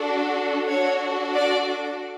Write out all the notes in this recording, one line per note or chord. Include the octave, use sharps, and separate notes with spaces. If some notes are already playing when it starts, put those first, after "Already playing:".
Already playing: D4 F#4 A4
D4 F#4 A4 C#5
D5